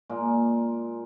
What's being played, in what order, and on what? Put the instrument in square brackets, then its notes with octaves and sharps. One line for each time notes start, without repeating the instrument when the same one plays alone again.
[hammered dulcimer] A#2 G#3 A#3